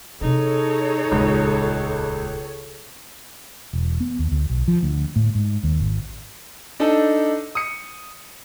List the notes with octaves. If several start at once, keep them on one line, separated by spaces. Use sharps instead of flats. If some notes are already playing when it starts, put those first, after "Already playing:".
C3 D#4 E4 G#4 A4 C#5
D#1 C#2 F4
E1
B3
D#2
D2
B1
F3
D2
A2
G#2
D#2
G#1
D4 D#4 A4
D#6 C#7